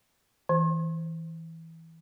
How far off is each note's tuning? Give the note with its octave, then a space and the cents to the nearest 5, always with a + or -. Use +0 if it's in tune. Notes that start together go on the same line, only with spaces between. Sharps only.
E3 -15